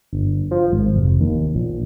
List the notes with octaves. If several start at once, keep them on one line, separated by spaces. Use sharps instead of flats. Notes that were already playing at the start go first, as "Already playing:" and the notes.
G1
F3
G#1
F1
D#2
A#1